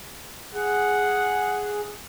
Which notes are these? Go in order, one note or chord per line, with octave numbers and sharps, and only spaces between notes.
G#4 F#5